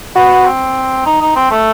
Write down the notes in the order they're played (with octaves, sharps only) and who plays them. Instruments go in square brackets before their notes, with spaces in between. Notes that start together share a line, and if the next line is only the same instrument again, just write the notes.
[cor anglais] B3 [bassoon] F#4
[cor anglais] C4
D#4
D#4
C4
A3